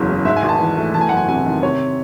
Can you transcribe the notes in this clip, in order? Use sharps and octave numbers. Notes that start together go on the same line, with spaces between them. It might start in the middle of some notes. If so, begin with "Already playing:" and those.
Already playing: F#1 E2 C#3 F#3
G#3
G#2 E5
G#5
G#1
A5
E3
A3
E2 A5
G#5
F#5
F#1
G#5
C3 G#5
D#3
C3 C#5